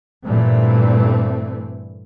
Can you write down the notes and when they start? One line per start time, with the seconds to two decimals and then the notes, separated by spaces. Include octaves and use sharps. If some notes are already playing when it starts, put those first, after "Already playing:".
0.24 G2 A#2 E3 G3 A3 C4